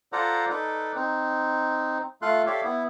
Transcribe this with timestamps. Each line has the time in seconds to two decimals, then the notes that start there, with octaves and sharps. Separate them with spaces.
0.13 F4 A4 C5 D5 F#5 A#5
0.50 D#4 A4 B4 D5
0.95 C4 D#4
2.22 A3 F4 A4 F5 C6 F#6
2.46 G4 A4 C#5 D5 E5 F5
2.64 B3 E4